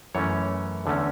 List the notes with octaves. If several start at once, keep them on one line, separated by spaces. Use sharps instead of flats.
F#2 E3 A3 C#4 C#5
E2 D3 A3 C#4